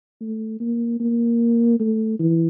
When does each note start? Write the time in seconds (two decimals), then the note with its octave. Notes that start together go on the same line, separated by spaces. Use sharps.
0.20 A3
0.60 A#3
1.00 A#3
1.80 A3
2.19 E3